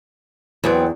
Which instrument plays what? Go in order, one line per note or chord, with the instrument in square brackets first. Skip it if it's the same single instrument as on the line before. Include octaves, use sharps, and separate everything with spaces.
[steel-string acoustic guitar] E2 [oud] F#3 B3 C4